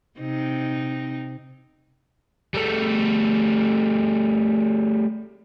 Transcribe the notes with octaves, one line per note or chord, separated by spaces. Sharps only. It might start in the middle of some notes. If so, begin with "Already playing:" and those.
C3 C4 D#4
G3 A3